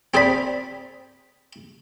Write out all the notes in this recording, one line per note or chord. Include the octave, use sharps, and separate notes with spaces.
C4 G#4 C5 D5 B5